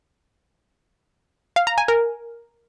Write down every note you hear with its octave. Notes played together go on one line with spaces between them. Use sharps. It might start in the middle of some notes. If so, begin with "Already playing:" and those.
F5
A#5
G#5
A#4